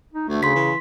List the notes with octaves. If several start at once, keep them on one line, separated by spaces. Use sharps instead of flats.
D#4
D2 A3
C#3 C6 B6
E3